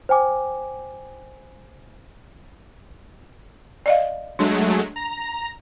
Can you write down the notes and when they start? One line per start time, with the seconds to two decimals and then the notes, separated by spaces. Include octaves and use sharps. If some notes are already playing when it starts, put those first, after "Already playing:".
0.09 C5 G5 G#5 D6
3.86 D5 D#5 F5
4.39 F#3 G#3 A3 D4
4.96 A#5